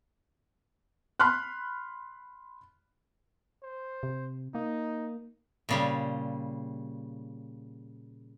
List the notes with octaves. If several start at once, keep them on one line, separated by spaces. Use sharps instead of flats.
B5 C6 F6 F#6
C5
C3
A#3 D#4
A#2 C#3 G3